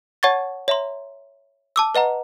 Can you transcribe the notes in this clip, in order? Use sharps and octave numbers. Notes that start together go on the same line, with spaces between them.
C#5 F#5 A5 C#6 G#6 A6
C#5 E5 A#5 C6
A5 D6 E6
B4 D#5 F#5 A#5